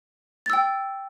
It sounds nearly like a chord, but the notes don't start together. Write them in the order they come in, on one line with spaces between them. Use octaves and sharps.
A6 E6 G5